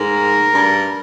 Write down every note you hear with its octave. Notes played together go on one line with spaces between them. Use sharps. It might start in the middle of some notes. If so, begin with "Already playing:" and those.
Already playing: G#2 A#4
G2